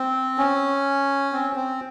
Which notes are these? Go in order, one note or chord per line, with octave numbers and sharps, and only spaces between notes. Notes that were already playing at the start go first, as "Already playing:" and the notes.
Already playing: C4
C#4
C4
C4